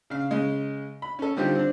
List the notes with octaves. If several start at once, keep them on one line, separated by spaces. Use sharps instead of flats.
C#3 F5
C#3 G#3
B5
C#4 A4
D3 D#3 G3 C4 F4 G4
C4 D4